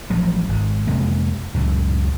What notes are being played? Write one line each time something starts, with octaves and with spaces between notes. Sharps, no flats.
A1 F3 F#3
G#1 G#2
F2 C3 G#3 A#3
C#2 F#2 A2